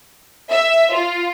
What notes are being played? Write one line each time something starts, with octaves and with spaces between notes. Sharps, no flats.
E5
F4